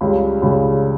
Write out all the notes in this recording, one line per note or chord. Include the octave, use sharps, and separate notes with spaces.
C#2 C#3 G3
C#2 C#3 G3